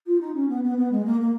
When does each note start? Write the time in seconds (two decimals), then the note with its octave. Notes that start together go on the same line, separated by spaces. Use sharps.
0.07 F4
0.21 D#4
0.35 C#4
0.49 B3
0.64 B3
0.78 B3
0.92 G#3
1.06 A#3
1.21 A#3